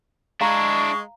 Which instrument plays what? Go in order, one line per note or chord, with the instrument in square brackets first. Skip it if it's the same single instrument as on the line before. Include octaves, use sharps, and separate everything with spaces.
[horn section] G#3 [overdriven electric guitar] D4 E4 [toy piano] F5 A#5 [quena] C#6